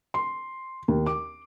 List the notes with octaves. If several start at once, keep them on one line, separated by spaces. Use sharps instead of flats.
C6
D#2
D6